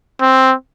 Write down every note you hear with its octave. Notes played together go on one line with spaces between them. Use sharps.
C4